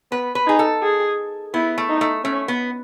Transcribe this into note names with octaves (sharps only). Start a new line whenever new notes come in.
B3 B4
B4
D#4 G#4
A4
G#4
B3 E4
A3
D#4
A3
A3 C#4
B3